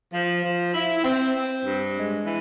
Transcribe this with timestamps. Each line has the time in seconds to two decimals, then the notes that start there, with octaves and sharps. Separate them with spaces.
0.13 F3
0.43 F3
0.74 E4
1.04 C4
1.35 C4
1.65 G2
1.96 G#3
2.25 E3